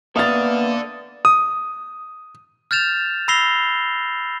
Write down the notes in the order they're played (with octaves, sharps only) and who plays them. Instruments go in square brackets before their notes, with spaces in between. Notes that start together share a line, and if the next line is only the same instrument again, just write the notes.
[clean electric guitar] A#3 E5 F5 [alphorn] B3 [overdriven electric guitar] A4 D5 [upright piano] D#6 A6
[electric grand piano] D#6
[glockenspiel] F6 G6 A6 E7 F7
B5 E6 A#6 C7 F7 G7